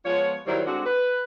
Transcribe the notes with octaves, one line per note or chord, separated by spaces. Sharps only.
F3 G#3 B3 F4 C#5
D#3 F#3 G3 E4 C5 C#5
D3 G#3 C4 D4 F#4
B4